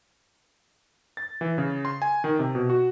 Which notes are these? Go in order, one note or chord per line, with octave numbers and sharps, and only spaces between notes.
A6
E3
C#3
C6
G#5
D#3
C3
B2
F#4